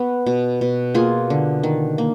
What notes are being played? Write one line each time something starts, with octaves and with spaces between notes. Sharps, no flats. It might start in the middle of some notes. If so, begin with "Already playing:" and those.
Already playing: B3 F#4
B2
B2
A#3 F4 G#4
D3
D#3
A#3